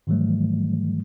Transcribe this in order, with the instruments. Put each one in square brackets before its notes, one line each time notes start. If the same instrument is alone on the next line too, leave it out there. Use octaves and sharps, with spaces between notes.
[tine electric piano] G#2 D#3 E3 F#3 G3 A3